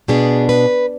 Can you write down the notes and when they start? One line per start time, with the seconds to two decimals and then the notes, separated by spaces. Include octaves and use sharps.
0.08 B2 B3 D4 G#4
0.49 B4